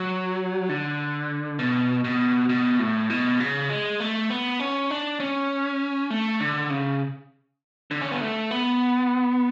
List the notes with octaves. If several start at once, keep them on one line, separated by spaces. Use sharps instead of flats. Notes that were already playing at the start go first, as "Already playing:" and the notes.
Already playing: F#3
D3
B2
B2
B2
A2
B2
C#3
G#3
A3
B3
C#4
D4
C#4
A3
D3
C#3
D3
C#4
B3
A3
B3